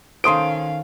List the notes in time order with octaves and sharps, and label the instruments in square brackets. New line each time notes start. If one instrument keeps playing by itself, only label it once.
[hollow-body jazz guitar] D#3 A4 C5 [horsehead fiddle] C#4 F5 [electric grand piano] C6 D#6 D7